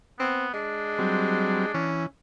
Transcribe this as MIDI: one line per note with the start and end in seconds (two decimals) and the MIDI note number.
0.19 0.52 59
0.19 0.46 60
0.54 1.73 56
0.54 1.91 62
0.98 1.66 54
0.98 1.66 55
0.98 1.66 60
1.74 2.06 52
1.74 2.05 61